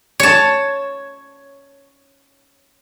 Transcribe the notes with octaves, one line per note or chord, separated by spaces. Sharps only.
C#5 A5